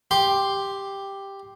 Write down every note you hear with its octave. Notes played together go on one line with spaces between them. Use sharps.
G4 C6